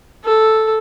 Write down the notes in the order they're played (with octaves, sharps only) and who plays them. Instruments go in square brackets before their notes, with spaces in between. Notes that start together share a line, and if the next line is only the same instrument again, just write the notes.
[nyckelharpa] A4